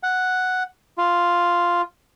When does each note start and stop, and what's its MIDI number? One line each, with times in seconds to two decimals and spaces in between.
0.03 0.63 78
0.98 1.82 65